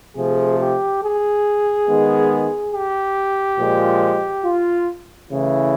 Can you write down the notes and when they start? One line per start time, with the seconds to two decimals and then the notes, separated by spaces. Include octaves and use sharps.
0.15 C3 F3 A3 G#4
0.59 G4
1.02 G#4
1.87 D#3 G#3 B3
2.73 G4
3.58 A#2 F3 G#3
4.44 F4
5.30 C#3 E3 A3 E4